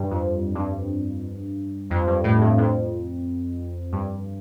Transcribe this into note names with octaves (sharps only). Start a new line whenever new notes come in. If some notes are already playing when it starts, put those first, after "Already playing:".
Already playing: G2
F2
G2
F2
G2
A2
G2
F2
G2